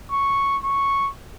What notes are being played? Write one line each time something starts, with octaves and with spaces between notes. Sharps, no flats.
C#6
C#6